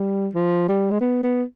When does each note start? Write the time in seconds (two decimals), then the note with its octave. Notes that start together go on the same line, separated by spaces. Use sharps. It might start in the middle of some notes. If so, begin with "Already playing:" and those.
Already playing: G3
0.35 F3
0.68 G3
0.91 G#3
1.01 B3
1.23 B3